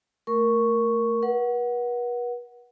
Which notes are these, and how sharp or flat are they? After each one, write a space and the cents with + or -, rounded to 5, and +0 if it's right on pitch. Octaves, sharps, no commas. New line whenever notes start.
A3 +15 A#4 +0 C#6 +0
B4 -40 F#5 +0